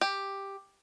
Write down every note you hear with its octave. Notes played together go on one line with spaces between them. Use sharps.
G4